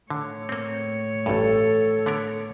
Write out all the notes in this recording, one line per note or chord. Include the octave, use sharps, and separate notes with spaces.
A2 D3 C#5
A#3 C4
A1 G2 A4
D3 B3 A#4